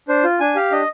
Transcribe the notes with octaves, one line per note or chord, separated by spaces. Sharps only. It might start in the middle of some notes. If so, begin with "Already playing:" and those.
D4 C5
F4
D4 G#5
G4 F5
D4 D#5